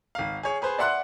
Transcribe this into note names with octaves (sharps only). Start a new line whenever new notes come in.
G#1 F5
G#4 C#5
G#4 B4 C5
D5 E5 F#5 C6 F#6